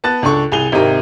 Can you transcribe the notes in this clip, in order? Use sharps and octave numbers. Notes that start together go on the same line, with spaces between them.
B3 A5 F#6 A6
C#2 D4 A4 C#6
C2 G#4 G#5 F7 G7
G#1 C3 D#4 G4 A#4